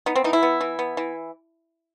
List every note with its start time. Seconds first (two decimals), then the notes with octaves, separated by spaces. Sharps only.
0.06 B3 D#4
0.16 C4
0.24 E3 D#4
0.33 E4
0.43 B3
0.61 E3
0.79 B3
0.97 E3